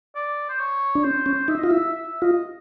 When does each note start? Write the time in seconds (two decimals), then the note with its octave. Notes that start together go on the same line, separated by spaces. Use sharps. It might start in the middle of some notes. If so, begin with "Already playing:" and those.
0.15 D5
0.49 C5
0.60 C#5
0.95 D4
1.04 C#4 C5
1.26 C#4
1.48 D#4 E5
1.58 D#5
1.63 F4
1.69 E4 E5
1.92 E5
2.22 F4 D#5